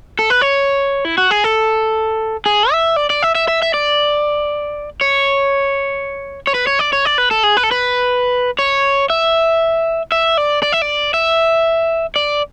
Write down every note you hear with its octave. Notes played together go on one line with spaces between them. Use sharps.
A4
B4
C#5
E4
F#4
G#4
A4
G#4
E5
D5
D5
E5
E5
E5
E5
D5
C#5
C#5
B4
C#5
D5
C#5
D5
B4
A4
G#4
B4
A4
B4
C#5
E5
E5
D5
D5
E5
D5
E5
D5